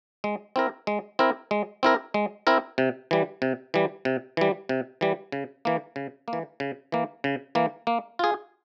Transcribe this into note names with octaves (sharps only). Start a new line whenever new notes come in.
G#3
C4 E4 A#4
G#3
C4 E4 A#4
G#3
C4 E4 A#4
G#3
C4 E4 A#4
C3
E3 G3
C3
E3 G3
C3
E3 G3
C3
E3 G3
C#3
E3 A#3
C#3
A#3
E3
C#3
E3 A#3
C#3
E3 A#3
A#3
F4 G#4